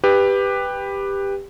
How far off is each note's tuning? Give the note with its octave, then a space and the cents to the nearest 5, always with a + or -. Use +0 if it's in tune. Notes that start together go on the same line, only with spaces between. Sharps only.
G4 +15 B4 +0